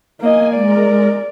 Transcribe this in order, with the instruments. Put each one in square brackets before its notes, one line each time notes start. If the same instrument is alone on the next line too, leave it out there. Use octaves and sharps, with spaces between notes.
[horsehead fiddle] A#3 D#5 [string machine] G#5
[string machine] G#3 A#4 [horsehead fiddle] D5